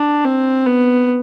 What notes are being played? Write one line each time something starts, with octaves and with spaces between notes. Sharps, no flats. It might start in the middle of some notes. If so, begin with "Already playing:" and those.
Already playing: D4
C4
B3